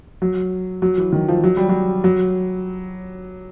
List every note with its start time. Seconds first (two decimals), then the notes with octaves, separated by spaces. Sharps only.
0.22 F#3
0.82 F#3
0.98 E3
1.12 D#3
1.28 F3
1.44 F#3
1.57 G3
1.69 F#3
2.04 F#3